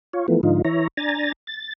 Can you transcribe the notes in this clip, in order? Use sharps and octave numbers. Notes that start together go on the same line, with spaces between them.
F4 C#5
E3 F3 A3 B3
G#2 D3 F3 D#4 F4
E3 E4 C#5 A#5
D4 G#5 A#5 A6
A6